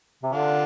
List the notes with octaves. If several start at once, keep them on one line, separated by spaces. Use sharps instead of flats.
C3
D3 D4 F4